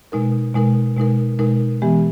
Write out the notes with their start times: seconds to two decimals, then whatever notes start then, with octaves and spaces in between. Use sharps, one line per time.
0.12 B2 G#3 D#4 A#4
0.54 B2 G#3 D#4 A#4
0.96 B2 G#3 D#4 A#4
1.39 B2 G#3 D#4 A#4
1.82 E3 G#3 B3 G4